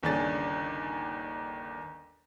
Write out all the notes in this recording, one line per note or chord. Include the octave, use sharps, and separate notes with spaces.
G1 D#2 C#3 D4 G#5 A6